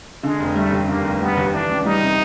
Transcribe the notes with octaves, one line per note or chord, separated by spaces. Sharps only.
D3 G#3
F1
G3 A3
D#2
D3 A#3
F1
G3 B3
D#2
E3 D4
C#2
G3 D#4
C3